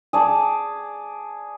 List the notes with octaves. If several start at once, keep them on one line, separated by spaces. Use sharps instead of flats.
G#4 D5 A5